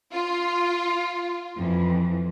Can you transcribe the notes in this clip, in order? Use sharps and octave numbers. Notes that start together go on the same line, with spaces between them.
F4
F2 E3